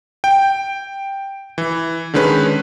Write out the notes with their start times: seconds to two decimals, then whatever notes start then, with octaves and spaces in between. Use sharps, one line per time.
0.24 G5
1.58 E3
2.14 D3 D#3 G#3 C#4 B4